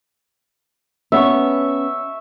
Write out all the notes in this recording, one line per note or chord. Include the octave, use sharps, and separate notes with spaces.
B3 C#4 E5 C#6